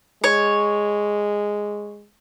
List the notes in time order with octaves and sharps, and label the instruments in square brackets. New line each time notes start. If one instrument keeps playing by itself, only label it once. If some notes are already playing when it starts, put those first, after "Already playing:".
[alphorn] G#3 [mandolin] C#5